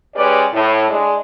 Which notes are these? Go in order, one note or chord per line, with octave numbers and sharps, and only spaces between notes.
G#3 C#4 G4 B4 D5
A2
G#3 D4